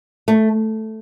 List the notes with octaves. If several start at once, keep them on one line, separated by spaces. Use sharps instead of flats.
A3